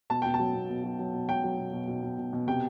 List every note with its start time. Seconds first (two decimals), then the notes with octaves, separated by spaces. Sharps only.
0.10 B2 A5
0.22 B2 G5
0.34 A5
0.39 F#3
0.55 B2
0.70 B2
0.84 F#3
0.99 F#3
1.14 B2
1.29 F#3 G5
1.44 F#3
1.58 B2
1.73 B2
1.88 B2
2.03 B2
2.18 B2
2.33 B2
2.47 C3 G5